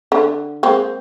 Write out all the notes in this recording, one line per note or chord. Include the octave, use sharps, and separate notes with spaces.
D3
G#3 A#3 C4